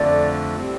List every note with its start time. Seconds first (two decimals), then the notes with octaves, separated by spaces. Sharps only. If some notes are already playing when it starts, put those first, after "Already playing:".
Already playing: F2 D3 A3 D5
0.56 A2 G3 C4